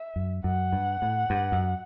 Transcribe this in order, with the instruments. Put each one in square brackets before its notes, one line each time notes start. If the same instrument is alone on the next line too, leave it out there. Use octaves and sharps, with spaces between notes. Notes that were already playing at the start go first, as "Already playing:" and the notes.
Already playing: [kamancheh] E5
[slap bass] F#2
[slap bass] F#2 [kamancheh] F#5
[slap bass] G2
A2
G2
F#2